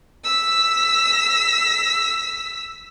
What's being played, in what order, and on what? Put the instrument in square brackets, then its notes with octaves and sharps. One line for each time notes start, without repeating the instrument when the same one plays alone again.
[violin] E6 B6